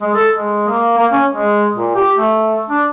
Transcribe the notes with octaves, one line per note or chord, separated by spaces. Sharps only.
G#3
A4
G#3
A#3
A#3
C#4
G#3
A#2
G4
A3
D4